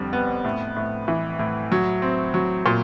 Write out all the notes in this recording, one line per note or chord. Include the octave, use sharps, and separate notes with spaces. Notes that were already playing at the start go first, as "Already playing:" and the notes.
Already playing: F2 D3 G3
B3
A2
A2
E3
A2
F#3
C4
F#3
A#2